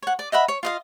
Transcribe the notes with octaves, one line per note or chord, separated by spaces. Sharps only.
C#5 F#5
D5
D#5 E5 F#5 B5
C#5
F4 D#5 F5